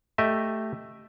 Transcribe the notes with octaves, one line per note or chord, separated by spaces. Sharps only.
A3 G4 D#5 E5